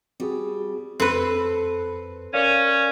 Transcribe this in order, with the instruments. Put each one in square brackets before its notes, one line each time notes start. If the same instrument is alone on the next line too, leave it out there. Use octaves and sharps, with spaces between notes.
[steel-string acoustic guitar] G3 [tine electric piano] C4 F#4 G#4
[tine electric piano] F2 [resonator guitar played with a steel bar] C4 B4 [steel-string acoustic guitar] A4 A5
[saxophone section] C#4 [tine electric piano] A#4 D5 F5